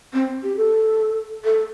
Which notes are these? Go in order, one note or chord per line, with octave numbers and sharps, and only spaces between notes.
C4
G4
A4
A4